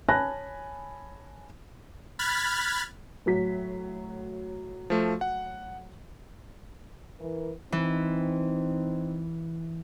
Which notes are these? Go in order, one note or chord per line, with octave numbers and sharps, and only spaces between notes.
C#5 G#5 A5 B5 F#6 A#6
B5 F6 F#6 G#6 A6 B6
A2 F#3 B6
F3 A3
F#5
E3 A#4
E3 C4 D#4